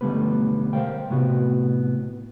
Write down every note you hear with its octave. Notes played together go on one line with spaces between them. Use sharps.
B1 D3 G3 A3 B3 B4
A#4 C5 D5 F5 G5
A2 C3 B3 F#4